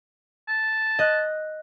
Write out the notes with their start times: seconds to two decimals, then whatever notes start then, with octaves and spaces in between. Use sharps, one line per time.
0.48 A5
0.99 D#5 F#6